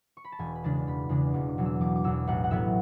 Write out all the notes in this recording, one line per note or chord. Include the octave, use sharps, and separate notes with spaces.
C#6
B5
A5
E1 G#5
B5
E2 C#3 G#3 D4 A5
E1 B5
E2 C#3 G#3 D4 D6
E1 D6
D6
E2 B2 F#3
E6
E1 D6
D6
E2 B2 F#3 E6
A1 F#5
F#5
A2 F#3 B3 E5